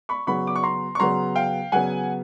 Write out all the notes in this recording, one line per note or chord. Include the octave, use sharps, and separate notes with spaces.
B5 C#6
C#3 F#3 B3 B5 C#6
D6
C#6
A#5 C6
C#6
C#3 F#3 B3 A#5 C6
F5 G5
C#3 F#3 B3 F#5 G#5